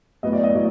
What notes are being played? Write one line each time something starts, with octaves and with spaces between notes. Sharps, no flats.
A2 F#3 B3 D#5
D5
D#5
A2 F#3